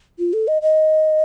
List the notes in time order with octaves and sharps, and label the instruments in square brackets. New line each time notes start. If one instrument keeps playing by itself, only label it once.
[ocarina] F4
A4
D#5
D#5